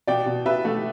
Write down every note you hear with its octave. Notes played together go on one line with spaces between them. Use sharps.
B2 D5 G5
B2
B2 B4 E5
A3